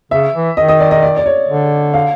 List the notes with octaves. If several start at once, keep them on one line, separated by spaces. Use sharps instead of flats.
C#3 E5
E3
D#3 D#5
D#5
D5
D#5
D5
D5
C#5
D3
F5